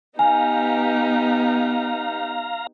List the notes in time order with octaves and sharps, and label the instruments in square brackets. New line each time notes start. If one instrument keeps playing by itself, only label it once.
[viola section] B3 [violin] D#4 G4 [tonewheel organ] F5 A#5 [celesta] G#5